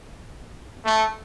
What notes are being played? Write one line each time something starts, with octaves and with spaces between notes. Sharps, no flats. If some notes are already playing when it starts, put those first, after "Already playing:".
A3